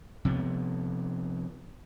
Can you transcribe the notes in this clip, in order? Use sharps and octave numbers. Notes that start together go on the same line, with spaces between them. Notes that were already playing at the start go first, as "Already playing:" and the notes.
C3 F3 B3